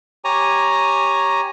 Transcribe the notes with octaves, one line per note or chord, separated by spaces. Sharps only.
G4 C#5 G#5 A#5